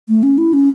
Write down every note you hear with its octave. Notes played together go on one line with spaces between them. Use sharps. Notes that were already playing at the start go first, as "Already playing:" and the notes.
A3
C#4
E4
C#4